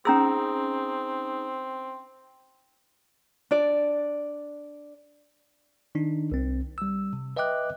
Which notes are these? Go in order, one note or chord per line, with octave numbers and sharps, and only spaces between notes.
C4 C#4 D#4 G#4 A#5 E6
D4 D5
D#3 D4 D#4
C2 C4
G3 E6
C3
B4 D#5 E5 G5 D6 F#6